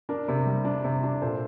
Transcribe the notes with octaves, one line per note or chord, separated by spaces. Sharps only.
D4 A#4
C3
G3
D4
C3
D4
A#2 A4 C5